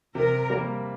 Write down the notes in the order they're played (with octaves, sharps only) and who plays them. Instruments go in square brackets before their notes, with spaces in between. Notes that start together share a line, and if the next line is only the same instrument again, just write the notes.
[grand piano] C3 [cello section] A#4
[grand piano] G3 A#3